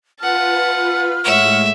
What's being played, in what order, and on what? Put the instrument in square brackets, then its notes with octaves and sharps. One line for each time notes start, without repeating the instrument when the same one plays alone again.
[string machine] F4 B4 [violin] F#5 A5 [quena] F6
[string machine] A2 G#3 [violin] C#5 F#5 [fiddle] E5